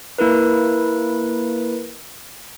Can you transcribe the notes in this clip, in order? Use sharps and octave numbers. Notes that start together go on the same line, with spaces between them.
A#3 E4 A#4 B4